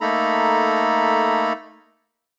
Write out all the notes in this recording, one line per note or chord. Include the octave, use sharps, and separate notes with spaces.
A3 A#3 D#4 A4 A#5 B5